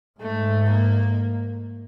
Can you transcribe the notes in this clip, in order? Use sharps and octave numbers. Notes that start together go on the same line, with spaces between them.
G#2 A3
A#3